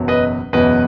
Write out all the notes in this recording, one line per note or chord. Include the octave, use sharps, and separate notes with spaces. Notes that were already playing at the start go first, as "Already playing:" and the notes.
Already playing: F#1 E2 B2 F#3
B4 D#5
F#1 E2 B2 F#3 B4 D#5